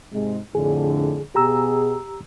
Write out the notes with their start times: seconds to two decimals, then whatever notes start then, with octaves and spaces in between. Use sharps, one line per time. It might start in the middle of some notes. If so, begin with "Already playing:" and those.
0.13 G#2 C3 G#3
0.55 F2 A2 D3 G#4
1.35 B2 G4 G#4 A#5 E6